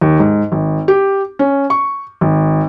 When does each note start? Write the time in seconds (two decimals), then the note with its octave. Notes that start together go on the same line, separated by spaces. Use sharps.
0.01 D#2
0.20 G#2
0.52 G#1
0.88 G4
1.39 C#4
1.70 C#6
2.21 G#1